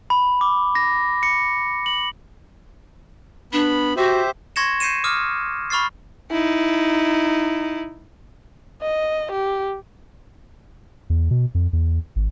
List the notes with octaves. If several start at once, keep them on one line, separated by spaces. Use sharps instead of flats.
B5
D6
A#6
C#7
F#7
B3 D4 B5
F#4 G4 C5 E5
C6 C#6 G#6 A#6 C#7 E7
G6 C7 C#7 D#7 E7
D6 D#6 F6
B5 C#6 F6 A6 C7
D#4 E4
D#5
G4
E2
B2
F2
E2
G#1